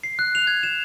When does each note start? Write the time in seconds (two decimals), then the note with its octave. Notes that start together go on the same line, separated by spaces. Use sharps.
0.03 C7
0.19 F#6
0.35 F7
0.47 G#6
0.63 E7